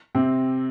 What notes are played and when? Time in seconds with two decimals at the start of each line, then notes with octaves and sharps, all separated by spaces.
0.15 C3 C4